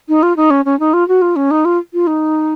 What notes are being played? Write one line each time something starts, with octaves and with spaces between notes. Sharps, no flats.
D#4
F4
D#4
C#4
C#4
D#4
F4
F#4
F4
C#4
D#4
F4
F4
D#4